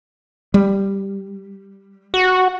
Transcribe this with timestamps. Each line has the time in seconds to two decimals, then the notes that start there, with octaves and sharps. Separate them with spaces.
0.54 G3
2.14 F#4